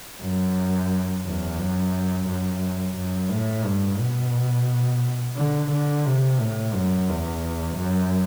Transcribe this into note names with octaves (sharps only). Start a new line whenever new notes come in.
F#2
E2
F#2
F#2
F#2
A2
G2
B2
D3
D3
C3
A2
F#2
E2
F#2